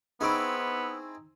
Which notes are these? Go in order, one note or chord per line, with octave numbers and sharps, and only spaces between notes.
B3 C4 D#4 E4 G#4 B5 C#6 D7